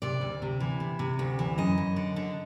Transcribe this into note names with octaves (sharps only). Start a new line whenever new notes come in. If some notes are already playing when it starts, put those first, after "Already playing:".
C3 D5
D2
C3
E3
C3
C3
D2
E3
F#2 D#5
F#2
D3
D3